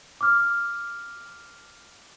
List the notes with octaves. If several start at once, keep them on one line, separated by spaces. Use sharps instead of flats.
D6 F6